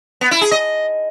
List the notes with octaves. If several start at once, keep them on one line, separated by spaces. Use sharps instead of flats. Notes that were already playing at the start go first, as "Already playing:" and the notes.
B3
E4
G#4
D#5